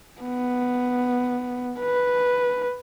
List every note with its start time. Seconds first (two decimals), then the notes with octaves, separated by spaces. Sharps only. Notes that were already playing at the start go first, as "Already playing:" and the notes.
0.21 B3
1.80 B4